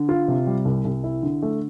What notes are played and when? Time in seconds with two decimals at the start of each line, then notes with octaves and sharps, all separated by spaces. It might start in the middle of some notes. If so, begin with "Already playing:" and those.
Already playing: D3
0.09 F4
0.28 C3
0.47 G3
0.65 C2
0.85 C2
1.04 E4
1.23 D3
1.42 A3